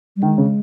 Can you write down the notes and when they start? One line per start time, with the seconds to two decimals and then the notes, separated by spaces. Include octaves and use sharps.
0.16 G3
0.23 D#3 G#3
0.38 C#3